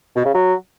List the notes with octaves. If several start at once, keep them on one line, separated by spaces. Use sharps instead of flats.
B2
C#3
F#3